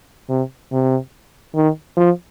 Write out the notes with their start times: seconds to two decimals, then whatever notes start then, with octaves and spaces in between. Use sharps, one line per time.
0.29 C3
0.72 C3
1.56 D#3
1.97 F3